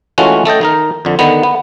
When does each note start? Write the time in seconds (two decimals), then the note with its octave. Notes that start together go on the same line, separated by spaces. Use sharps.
0.18 E3 G#3 A3 C#4 F4 F#4
0.45 A3 A4 D#5 G5
0.61 D#3 D#4 A#4
1.05 F2 D3
1.19 D3 D#3 B3
1.43 B3